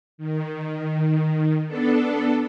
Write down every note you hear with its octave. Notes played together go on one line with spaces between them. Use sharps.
D#3
B3 D4 A4